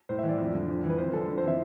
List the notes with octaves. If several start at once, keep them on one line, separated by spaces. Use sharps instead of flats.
A2 C5
E5
E3
D5
F2
D3
F2
E3
B4
F2 C5
D3 A4
F2
C5
C3 E3 E5